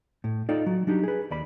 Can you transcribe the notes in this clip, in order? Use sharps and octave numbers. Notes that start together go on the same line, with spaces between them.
A2
D#4 F4 A4 D5 G5
F#3
F#3 D4 D#4 G4
G#4 B4
D#2 D5 B5